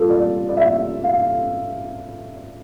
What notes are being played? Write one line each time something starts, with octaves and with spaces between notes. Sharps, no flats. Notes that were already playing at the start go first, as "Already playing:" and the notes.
Already playing: G3 F4 A4
D5
D5
E5
F5